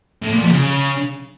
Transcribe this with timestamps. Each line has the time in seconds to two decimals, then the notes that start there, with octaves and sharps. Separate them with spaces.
0.23 A2
0.33 A#2
0.43 F2
0.53 C#3